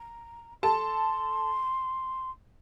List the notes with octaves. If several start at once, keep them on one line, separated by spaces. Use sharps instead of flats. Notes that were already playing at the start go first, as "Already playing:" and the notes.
Already playing: A#5
A4 A5 C6